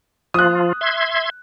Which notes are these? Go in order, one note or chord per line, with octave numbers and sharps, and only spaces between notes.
F3 F4 D#6 F#6
E5 C6 G#6